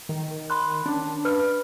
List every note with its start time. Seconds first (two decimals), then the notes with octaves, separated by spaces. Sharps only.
0.09 D#3
0.50 B5 C6 F#6
0.86 C#4 D4
1.25 B4 F6